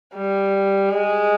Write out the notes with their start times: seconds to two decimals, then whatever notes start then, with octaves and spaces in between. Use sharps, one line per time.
0.15 G3
0.90 G#3